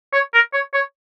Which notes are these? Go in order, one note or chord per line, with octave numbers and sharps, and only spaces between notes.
C#5
A#4
C#5
C#5